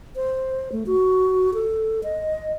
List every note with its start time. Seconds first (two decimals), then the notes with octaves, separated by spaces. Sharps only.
0.16 C5
0.72 A3
0.87 F#4
1.54 A4
2.03 D#5